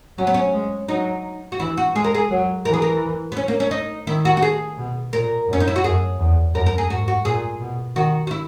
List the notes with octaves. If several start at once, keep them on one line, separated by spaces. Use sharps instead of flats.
F#3 C#4
B3
C#4
G#3
F#3 D#4
F#4
E3 E4
F#4
G#3 G#4
A#4
G#4
F#3
E3 A#4
G#4
A#4
B3
C#4
A#3
C#4
D#4
D#3 E4
F#4
F#4
G#4
B2
A#2 A#4
F#2 C#4
D#4
E4
F#4
F#2 G#4
E2
F#2 A#4
A#4
G#4
G#2 F#4
F#4
A#2 G#4
B2
D#3 F#4
F#4
E4